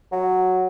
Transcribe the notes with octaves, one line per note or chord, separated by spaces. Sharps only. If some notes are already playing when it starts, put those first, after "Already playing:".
F#3